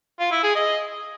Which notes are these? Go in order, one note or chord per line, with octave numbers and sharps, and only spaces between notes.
F4
E4
G#4
D#5